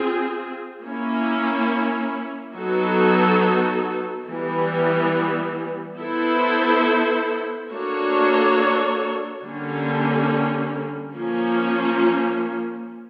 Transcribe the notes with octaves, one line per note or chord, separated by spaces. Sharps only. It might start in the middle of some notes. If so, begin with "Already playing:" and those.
Already playing: C4 F4 G#4
A#3 C#4 E4
F#3 B3 D#4 F#4 A4
E3 G3 B3
B3 E4 A4 C5
A#3 D4 F#4 A4 C#5
D3 G3 A#3 C#4
F3 A#3 C#4